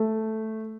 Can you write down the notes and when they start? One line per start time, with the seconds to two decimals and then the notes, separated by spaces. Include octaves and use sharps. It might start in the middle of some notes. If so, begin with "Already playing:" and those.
Already playing: A3